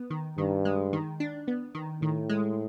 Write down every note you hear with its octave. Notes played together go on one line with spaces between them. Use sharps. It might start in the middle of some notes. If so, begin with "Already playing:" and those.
Already playing: B3
D#3
G2 D#3
G#3
D#3
D4
B3
D#3
A2 D#3
G#3